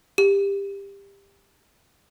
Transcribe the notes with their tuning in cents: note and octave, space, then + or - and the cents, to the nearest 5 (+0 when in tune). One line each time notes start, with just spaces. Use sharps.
G4 +20